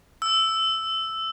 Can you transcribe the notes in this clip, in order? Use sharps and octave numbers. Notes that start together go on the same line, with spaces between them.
E6